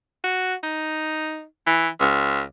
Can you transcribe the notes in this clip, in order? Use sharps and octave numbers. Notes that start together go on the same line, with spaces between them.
F#4
D#4
E3
C#2